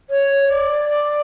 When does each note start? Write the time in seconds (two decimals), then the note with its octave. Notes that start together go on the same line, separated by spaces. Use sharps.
0.09 C#5
0.48 D5
0.85 D5